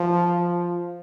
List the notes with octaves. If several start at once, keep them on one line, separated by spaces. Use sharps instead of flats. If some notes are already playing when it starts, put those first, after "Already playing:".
Already playing: F3